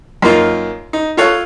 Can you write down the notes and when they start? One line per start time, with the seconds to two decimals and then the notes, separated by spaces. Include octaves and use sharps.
0.22 F#2 A#3 D#4 F4
0.93 D#4
1.17 F4 A4 C#5 F5 F#6